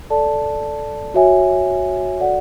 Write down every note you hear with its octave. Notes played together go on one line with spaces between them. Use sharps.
A4 D5 A5
F#4 C#5 E5 G#5
F#4 A4 D5 F#5